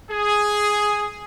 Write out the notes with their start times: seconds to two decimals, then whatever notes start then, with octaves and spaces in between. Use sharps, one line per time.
0.10 G#4